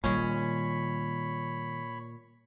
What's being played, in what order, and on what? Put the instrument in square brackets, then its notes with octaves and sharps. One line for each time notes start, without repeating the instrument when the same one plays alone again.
[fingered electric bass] A#2 [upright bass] D#3 G3 [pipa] G#3 C#4 [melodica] C#5 B5